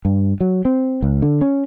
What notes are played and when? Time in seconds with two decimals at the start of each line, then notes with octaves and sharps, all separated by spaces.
0.05 G2
0.41 F#3
0.65 C4
1.03 C#2
1.22 D3
1.41 C#4